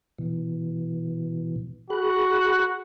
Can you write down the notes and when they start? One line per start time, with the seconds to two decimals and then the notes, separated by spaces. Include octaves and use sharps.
0.18 B2 E3
1.90 F#4 G#4 B5 F#6